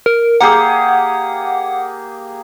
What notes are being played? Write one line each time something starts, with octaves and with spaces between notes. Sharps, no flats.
A#4
A#3 G4 G#4 F#5